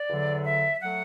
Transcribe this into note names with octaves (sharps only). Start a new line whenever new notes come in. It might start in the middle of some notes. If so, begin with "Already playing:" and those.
Already playing: D5
E2 D3 F#3
E5
F#3 A3 F#5